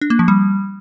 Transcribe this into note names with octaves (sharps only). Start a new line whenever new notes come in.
D4
A#3
F3
G3